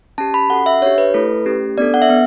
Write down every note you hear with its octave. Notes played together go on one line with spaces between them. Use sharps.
C#4 G4 A5
B5
C#4 F#4 A4 F#5
E5
D4 G4 C#5
B4
A3 E4 A4
A3 C#4 G4
B3 D4 A4 D5
F#5
E5
B3 F#5